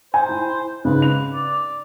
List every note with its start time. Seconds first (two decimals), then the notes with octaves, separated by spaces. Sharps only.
0.14 C5 G#5
0.29 E4
0.85 G#2 C#3 B4
1.02 F7
1.34 D5